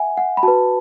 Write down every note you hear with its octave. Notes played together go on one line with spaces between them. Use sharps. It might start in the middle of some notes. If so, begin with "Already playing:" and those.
Already playing: E5 F#5 G#5
F#5
B5
F#4 B4 A5